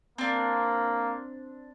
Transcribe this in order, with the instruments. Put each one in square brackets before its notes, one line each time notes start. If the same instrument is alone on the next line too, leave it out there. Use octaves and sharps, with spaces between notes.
[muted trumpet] A#3 [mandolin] C4 D4